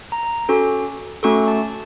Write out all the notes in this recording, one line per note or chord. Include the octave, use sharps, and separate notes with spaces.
A#5
C#4 F#4 A4
A3 C#4 F#4 A4 C#6
A5